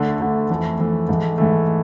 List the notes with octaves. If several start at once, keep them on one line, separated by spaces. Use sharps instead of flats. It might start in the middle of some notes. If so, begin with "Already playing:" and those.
Already playing: D2 D3 A3
D2 D3 A3
F2 E3 A3
F2 E3 A3
G#2 E3 A3
G#2 E3 A3